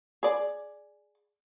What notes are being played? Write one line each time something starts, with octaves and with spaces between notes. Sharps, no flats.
G#4 D5